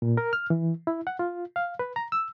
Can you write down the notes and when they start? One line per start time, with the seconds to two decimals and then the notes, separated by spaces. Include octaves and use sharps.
0.02 A#2
0.17 A#4
0.33 F6
0.50 E3
0.87 E4
1.07 F#5
1.19 F4
1.56 F5
1.79 B4
1.96 A#5
2.12 E6